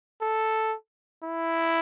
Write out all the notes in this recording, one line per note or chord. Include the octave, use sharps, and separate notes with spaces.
A4
E4